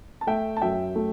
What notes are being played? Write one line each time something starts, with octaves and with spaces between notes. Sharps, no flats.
A5
A3 E5 G5
A5
F#2 E5 G5
A3